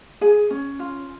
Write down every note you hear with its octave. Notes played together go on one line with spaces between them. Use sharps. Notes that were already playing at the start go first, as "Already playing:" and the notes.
G#4 G#5
C#4
F4